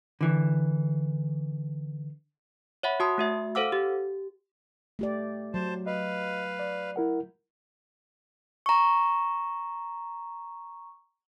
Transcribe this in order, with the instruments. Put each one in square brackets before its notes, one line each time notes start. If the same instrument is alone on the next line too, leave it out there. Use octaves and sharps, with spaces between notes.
[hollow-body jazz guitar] D3 E3
[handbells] C#5 E5 F#5 B5
F#4 A5 C6 D#6
A3 F#4 E5
A4 C5 F5 F#5 D6 E6
G4
[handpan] A3 G4 D5
[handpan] F#3 [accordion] C5 A5
[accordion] B4 F5 [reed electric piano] D#5
[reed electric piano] D5
E4 A#4 F#5
[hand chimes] A#5 C#6